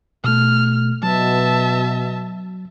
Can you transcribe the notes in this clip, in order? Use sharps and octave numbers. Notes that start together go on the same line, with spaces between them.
B2 A3 F6
B2 F#3 E5 A5